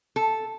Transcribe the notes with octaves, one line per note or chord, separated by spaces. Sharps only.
A4